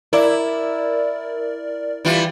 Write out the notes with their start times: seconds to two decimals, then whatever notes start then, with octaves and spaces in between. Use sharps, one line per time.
0.13 E4 A#4 D5
2.05 E3 G3 F4